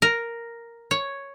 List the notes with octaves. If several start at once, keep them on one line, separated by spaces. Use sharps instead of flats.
A#4
C#5